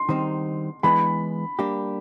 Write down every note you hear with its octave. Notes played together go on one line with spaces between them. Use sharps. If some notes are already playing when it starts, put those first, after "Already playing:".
Already playing: C6
D#3 G3 C4 D#4
E3 G#3 B3 B5
G3 A#3 D4 G4